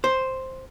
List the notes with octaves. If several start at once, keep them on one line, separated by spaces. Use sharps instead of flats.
C5